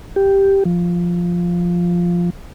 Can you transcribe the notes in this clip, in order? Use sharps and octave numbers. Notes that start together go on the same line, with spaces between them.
G4
F3